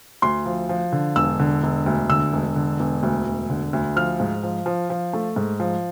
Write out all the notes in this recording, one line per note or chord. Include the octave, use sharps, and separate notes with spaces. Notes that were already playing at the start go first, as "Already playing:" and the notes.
D2 C6
F3
F3
D3
E1 E6
D3
E1
D2
D3 E6
E1
D3
E1
D2
E1
D3
D2
F3 F6
G#2
F3
F3
F3
A3
G#2
F3